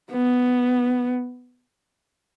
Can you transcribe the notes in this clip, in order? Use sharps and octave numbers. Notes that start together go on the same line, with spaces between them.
B3